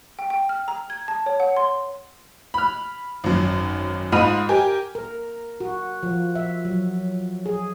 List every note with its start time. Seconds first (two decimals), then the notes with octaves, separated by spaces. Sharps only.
0.19 G5
0.30 G5
0.49 F6
0.68 A#5
0.90 G#6
1.08 A5
1.26 C#5
1.40 F#5
1.57 C6
2.54 B5 F6
3.24 G#1 F#2
4.12 G#2 F4 D#5 B5 F6 D#7
4.49 G4 A#4 G#5
4.95 A#4
5.60 F#4
6.03 F3
6.35 E5
6.65 F#3
7.46 G#4